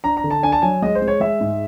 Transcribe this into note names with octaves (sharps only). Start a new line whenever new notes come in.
D4 A#5
A#5
D3
A5
D4 G#5
A5
F#3 G#5
G#3 D#5
C5
G#3
C#5
G#3 E5
G#2